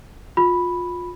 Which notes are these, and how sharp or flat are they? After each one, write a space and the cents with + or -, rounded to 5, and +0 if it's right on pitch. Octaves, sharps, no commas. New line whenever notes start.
F4 +25 B5 +0